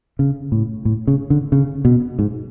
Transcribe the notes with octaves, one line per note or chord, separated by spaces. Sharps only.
C#3
A2
A2
C#3
D3
C#3
B2
G#2